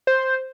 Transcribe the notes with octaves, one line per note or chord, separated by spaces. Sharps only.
C5